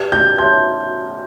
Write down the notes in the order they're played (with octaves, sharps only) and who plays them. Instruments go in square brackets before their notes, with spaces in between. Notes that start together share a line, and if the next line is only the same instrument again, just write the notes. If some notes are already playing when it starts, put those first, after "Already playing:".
Already playing: [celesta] G4 B4 D5 G5 [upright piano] G#6
[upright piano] G6
[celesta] C#5 E5 A5 C6 [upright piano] G6